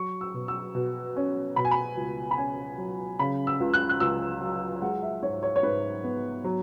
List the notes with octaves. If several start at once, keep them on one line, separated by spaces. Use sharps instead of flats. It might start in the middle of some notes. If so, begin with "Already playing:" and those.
Already playing: F#3 C#6
E6
B2
E6
B2
C#4
B2 B5
G#5
B5
C#2
B5
C#4 G#5
F#3
C#3 B5
E6
C#2
F#6
F#6
C#2 E6
F#3
G#3 F#5
E5
G#2 C#5
C#5
C#5
G#2 B4
B3
F#3